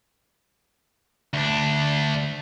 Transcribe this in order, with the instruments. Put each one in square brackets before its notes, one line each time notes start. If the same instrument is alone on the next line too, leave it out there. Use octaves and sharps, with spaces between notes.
[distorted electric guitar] D2 D4